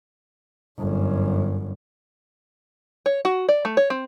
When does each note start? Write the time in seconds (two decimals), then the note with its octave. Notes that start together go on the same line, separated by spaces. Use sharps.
0.79 G1 F#2
3.06 C#5
3.25 F#4
3.49 D5
3.65 A3
3.77 C#5
3.90 C4